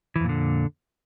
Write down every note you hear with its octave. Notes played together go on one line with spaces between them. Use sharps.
F2 A#2 D3 E3